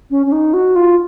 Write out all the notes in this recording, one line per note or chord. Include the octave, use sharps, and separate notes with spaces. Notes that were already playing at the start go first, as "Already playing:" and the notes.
C#4
C#4
D#4
F#4
F4